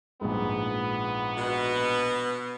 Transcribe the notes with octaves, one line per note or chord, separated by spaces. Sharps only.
A#1 G#2 B3
B2